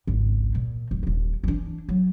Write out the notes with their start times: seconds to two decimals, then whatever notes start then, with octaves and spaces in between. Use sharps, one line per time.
0.07 G#1 C#2
0.55 A#2
0.91 D1
1.03 D#1 D#2
1.44 E3 D4
1.89 F#3